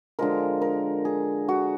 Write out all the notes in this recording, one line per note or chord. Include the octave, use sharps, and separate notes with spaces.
D3 F3 G#3 A#4
A#4
G#4
F#4